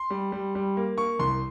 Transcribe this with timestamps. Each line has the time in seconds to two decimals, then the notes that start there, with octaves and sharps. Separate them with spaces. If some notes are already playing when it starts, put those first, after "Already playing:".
Already playing: C6
0.10 G3
0.32 G3
0.55 G3
0.77 A#3
0.98 A#3 C#6
1.19 C2 C6